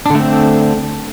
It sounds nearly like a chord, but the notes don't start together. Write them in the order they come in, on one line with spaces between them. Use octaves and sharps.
D4 D3 A3 C4